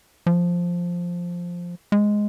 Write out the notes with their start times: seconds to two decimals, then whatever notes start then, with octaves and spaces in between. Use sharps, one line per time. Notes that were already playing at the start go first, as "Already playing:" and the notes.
0.27 F3
1.92 G#3